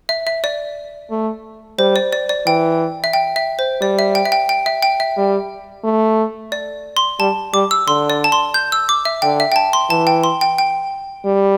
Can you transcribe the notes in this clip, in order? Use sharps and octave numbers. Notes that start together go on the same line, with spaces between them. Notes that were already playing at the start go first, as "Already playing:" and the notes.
E5
E5
D5
A3
G3 C5
D5
D5
D5
E3 G5
E5
G5
E5
C5
G3 D5
E5
G5
E5
G5
G5
E5
G5
E5
G3
A3
D5
C6
G3 A5
G3 D6
E6
D3 C6
D5
A5
C6
G6
E6
D6
E5
D3 G5
E5
G5
A5
C6
E3 A5
G5
C6
G5
G5
G3